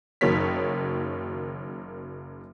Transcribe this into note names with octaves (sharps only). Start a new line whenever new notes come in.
F#1 D#3 F#3 A#3 C#5 B6